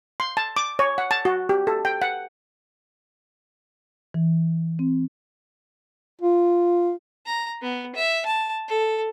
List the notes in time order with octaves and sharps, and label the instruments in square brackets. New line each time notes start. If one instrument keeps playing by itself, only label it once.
[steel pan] C6
A5
D6
C#5
F#5
A5
F#4
G4
A4
G5
F#5
[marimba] E3
C4
[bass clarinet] F4
[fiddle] A#5
B3
E5
A5
A4